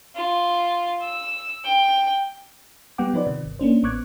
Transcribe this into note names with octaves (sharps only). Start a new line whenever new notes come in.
F4
E6
G5
G3 B3 F#5 G5 D6
F3 D#4 B4 C5 D5
C3 D#3
G1
A#3 C#4 D4 C5
A1 B3 C#6 D6 F#6 G#6